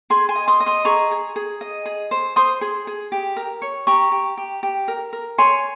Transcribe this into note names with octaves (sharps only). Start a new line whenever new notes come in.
G#4 G#5 C6
G#5 C6
D#5
C6 D#6
D#5
C6 D#6
G#4 A#5 C#6
G#4
G#4
D#5
G#4
C5
C5 C6 D#6
G#4
G#4
G4
A#4
C#5
G4 A#5 C#6
G4
G4
G4
A#4
A#4
C#5 G#5 C6